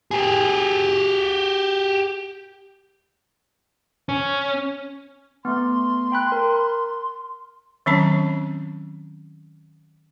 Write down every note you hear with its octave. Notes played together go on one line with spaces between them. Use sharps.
G4 G#4
C#4
A3 B3 C6
G5 B5 F#6
A#4
D#3 F#3 C4 C#4 A5 B5